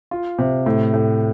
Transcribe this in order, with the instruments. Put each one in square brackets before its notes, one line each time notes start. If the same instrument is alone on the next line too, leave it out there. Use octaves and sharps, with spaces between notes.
[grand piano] F4
C3
A2
A2